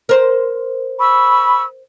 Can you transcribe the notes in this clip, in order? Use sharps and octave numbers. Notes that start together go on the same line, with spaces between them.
A#4 C5
B5 C#6 E6